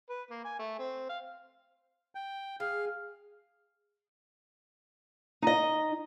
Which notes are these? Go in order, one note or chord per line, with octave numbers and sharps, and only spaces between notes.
B4
A#3
G#5
A3
C4
F5
G5
G#4 F5
D#4 D#5